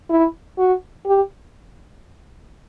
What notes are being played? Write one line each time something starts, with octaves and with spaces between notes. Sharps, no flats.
E4
F#4
G4